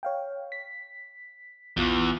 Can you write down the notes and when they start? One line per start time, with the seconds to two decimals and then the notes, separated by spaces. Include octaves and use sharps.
0.03 C#5 F5 G5
0.52 B6
1.77 A#1 E2 F4 F#6